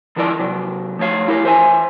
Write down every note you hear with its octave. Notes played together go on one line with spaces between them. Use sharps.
D#3 F3 E4 A#4 D5
C3 F#3
F3 A3 C#5 F5
E4 G4 A#4 F5
E3 C5 E5 G#5